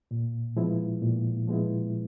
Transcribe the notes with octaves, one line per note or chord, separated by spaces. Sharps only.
A#2
F3 G#3 B3 E4
A#2
F3 G#3 B3 E4